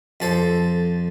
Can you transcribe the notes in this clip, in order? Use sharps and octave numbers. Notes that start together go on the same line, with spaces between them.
F2 A4 C5